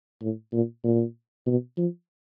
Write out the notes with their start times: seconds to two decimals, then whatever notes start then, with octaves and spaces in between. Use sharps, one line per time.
0.22 A2
0.53 A#2
0.84 A#2
1.46 B2
1.77 F3